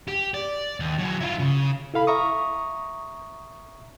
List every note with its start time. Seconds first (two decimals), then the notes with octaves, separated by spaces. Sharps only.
0.07 G4
0.34 D5
0.80 D#2
0.98 F#3 E4
1.21 E4 F4
1.39 C#3
1.94 E4 A4 F5 B5
2.07 E5 A#5 C#6 D#6